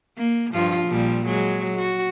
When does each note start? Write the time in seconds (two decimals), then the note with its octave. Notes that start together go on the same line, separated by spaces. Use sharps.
0.18 A#3
0.54 G2 F3 F4
0.88 A#2 F3 G3
1.26 F#3 G#3
1.77 F#4